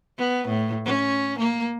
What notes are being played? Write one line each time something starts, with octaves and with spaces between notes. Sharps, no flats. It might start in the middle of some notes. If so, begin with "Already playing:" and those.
B3
A2
C#4
A#3